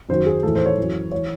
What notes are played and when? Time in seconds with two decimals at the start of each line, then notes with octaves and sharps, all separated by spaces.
0.09 F#2 D#3 F#3 C5
0.26 G#4
0.43 A2 E3 A4
0.55 C5
0.66 C#5
0.78 F#2 E3
1.12 E3 C#5